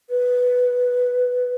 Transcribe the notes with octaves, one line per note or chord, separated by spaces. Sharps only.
B4